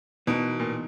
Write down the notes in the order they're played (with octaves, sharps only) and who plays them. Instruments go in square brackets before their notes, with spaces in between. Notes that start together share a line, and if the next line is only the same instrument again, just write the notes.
[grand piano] B2 [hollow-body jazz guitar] E3 B3 D#4 A#4
[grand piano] A#2